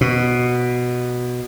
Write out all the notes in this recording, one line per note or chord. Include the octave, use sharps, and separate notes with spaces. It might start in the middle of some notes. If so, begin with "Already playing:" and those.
B2